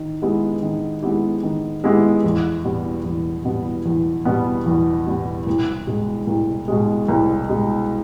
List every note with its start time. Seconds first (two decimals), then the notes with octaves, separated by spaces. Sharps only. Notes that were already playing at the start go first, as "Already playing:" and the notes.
Already playing: D#3
0.22 G#3 B3 E4 G4
0.63 D#3
1.02 G#3 B3 E4 G4
1.43 D#3
1.84 G#3 B3 E4 G4
2.24 E2
2.64 B2 G3 B3
3.04 E2
3.45 B2 G3 B3
3.86 E2
4.25 B2 G3 B3
4.66 E2
5.06 B2 G3 B3
5.46 C2
5.87 B2 G#3
6.27 C2
6.68 B2 G#3
7.08 C2
7.49 B2 G#3